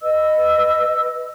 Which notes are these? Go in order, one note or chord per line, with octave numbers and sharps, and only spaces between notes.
B4 D#5 E6